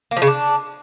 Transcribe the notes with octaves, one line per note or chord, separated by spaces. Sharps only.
A#3
F3
C#3
D4